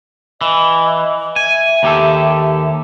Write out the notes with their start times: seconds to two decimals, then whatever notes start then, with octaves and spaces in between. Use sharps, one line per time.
0.41 E3 D#5
1.36 E5 G#5
1.83 D#2 G4 A4